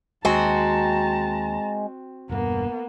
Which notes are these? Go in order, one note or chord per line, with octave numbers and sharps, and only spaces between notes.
D#2 G#3 C4 F#4 A5 A#5
E1 G2 A#3 B3